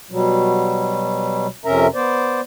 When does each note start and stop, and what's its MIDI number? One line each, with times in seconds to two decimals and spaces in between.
0.11 1.47 47
0.11 1.47 54
0.11 1.47 55
1.65 1.87 41
1.65 1.87 48
1.65 1.87 61
1.65 1.87 70
1.65 1.87 76
1.65 1.87 82
1.94 2.41 59
1.94 2.41 72
1.94 2.41 74